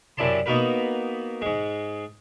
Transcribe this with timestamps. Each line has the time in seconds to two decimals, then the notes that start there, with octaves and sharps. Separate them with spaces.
0.17 F#2 C3 E4 D5 A5 C6
0.46 A#3 B3 D#4 F#4 A#4 B4
1.41 G#2 G#3